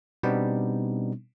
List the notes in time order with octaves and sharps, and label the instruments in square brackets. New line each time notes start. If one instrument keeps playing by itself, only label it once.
[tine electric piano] B2 G3 B3 C4 D4 D#4